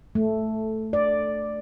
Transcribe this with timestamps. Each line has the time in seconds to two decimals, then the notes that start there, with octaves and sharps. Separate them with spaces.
0.15 A3
0.93 D5